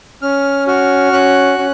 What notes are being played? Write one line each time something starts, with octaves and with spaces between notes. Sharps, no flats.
C#4 F6
F#4 F6
C#4 F#6
C#4